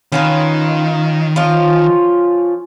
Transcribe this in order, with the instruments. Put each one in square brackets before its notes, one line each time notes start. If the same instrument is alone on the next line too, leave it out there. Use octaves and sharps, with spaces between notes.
[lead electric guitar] D#3 [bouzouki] C#4 F4 B4
[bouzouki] F3 C#4 F4